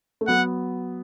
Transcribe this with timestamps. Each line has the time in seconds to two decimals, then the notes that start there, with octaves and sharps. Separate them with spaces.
0.21 A3
0.27 F#3 B3 F#5